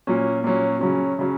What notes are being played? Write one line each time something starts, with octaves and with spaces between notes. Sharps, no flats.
A#2 F#3 C#4
A#2 F#3 C#4
C#3 F#3 C#4
C#3 F#3 C#4